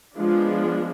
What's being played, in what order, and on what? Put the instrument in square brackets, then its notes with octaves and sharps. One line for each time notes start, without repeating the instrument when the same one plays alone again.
[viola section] F3 G#3 B3 D4 F4